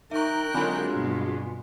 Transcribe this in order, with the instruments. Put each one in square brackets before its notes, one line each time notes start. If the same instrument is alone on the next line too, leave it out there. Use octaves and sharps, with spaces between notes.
[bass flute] D#4 [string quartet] A#4 G5 F#6 [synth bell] E5 C#6
[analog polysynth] D3 F#3 G#3 [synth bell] C4 G#5 B5 [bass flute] F4
[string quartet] G2 B2